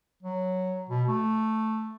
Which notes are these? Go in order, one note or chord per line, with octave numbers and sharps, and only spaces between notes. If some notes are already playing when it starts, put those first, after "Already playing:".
F#3
B2
A3